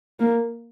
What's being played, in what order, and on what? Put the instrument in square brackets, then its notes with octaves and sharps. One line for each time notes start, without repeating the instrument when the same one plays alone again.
[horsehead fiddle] A#3